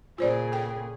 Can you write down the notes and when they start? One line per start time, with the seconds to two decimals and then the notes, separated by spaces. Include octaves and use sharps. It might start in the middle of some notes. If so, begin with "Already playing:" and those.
0.18 A#2 C#3 F4 G#4 C5 D5
0.52 A4 G5